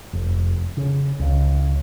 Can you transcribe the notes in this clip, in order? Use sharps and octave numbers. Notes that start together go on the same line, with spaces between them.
F1
C#3
C#2